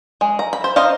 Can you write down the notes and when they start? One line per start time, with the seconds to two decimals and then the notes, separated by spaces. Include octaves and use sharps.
0.21 G#3
0.39 A#5
0.53 B5
0.64 C5
0.76 D#4 C5 D#5 F5